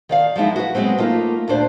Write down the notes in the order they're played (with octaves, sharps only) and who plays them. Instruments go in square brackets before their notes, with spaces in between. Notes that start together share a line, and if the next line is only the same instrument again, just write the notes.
[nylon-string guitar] D#3 D5 F5
F3 F#3 G#3 D#4 E4
F#4 B4
F#3 G#3 B3 C4
A3 A#3 D#4 F4
D2 A#2 D4 C5